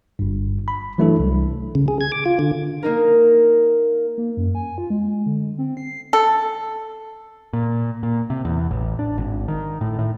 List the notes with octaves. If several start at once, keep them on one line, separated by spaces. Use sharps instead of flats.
G1 G2
B5
E3 F#3 A3 D4 E4 A4
C2
C#3
G#4
G#6
D6
F4
D3
A#3 D#4 A#4
A#3
F#2
G#5
F4
G#3
D3
C4
C7
A4
A#2
A#2
C3
E2
A1
D4
G#1
D#3
A2
A2